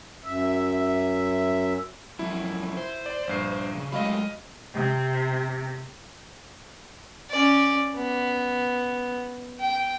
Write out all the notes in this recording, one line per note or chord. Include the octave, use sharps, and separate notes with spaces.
F#2 E5
F#2 F3 E4
C5
D5
A#1 G2 C7
C#3
F#3 G#3 A3 D#5 F5 B5
C3
C#4 D5
B3
G5